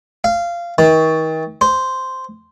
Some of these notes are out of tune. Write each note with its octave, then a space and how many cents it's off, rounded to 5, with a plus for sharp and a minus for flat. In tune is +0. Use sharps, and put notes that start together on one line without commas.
F5 -15
D#3 +40
C5 -5